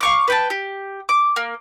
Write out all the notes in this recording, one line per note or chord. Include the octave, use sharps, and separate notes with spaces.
F5 C#6 D6
B4 G5 A5
G4
D6
A#3